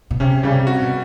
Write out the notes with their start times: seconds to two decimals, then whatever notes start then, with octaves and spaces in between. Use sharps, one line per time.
0.11 B2
0.20 C3 C#4
0.43 C#3 G3
0.51 C3
0.67 F#4
0.82 B2